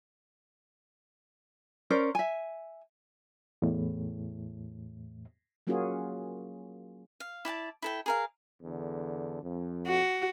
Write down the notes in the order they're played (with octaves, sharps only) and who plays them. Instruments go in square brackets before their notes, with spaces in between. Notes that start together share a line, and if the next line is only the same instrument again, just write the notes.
[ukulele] C#4 A#4 C5 D5
E5 G#5
[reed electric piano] E2 A2
[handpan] F#3 A#3 C#4 F4 F#4 G#4
[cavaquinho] F5
E4 D5 G5 A5
E4 A4 G5
G#4 A#4 F5
[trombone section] E2 D3
F2
[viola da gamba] F#4